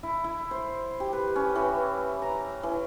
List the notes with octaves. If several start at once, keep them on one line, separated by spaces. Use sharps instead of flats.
E4
E4
C5
G4
B4
C#4
E3
A#5
E3